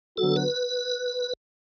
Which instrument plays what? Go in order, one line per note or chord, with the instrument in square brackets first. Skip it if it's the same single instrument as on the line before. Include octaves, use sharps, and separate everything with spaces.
[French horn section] D3 F#3 B3 F#4 [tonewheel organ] A4
[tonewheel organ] B4